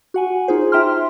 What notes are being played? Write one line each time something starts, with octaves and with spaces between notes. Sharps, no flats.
F#4 F#5 G#5
D#4 F4 G#4 C5
F4 E5 G5 A#5 C6 F6